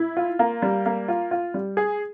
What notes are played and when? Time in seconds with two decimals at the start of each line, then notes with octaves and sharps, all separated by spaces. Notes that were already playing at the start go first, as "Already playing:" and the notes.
Already playing: E4
0.17 F4
0.39 A#3
0.62 G3
0.86 A#3
1.08 F4
1.31 F4
1.54 G3
1.77 G#4